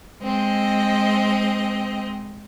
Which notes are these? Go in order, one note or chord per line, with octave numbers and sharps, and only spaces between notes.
G#3 C4 D#5